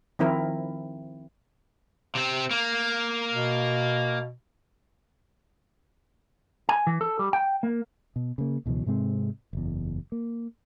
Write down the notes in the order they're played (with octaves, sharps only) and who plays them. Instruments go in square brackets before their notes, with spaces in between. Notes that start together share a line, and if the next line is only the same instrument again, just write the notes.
[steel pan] D#3 F3 C4 E4 A#4
[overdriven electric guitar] C3 C4
A#3
[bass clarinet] B2
[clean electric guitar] G#5
E3
A4
G3
G5
A#3
[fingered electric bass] B2
C#3 A#3
C#2 B2 E3 F#3
G#2 C3 G#3 C4
F#1 E2
A#3